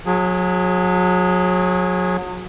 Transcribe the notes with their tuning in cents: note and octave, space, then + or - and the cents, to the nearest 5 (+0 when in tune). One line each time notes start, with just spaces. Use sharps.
F#3 -30 G#4 +0